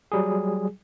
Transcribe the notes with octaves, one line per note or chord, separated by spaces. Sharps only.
F#3 G3 G#4